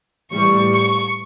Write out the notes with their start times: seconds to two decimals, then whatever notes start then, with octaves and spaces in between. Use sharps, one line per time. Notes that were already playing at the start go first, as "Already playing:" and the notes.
0.32 A2 E3 G3 C#6
0.74 C#6